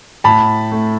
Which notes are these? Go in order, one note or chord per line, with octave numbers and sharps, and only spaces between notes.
A2 A5 B5
A3